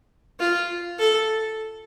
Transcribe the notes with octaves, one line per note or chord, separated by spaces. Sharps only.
F4
A4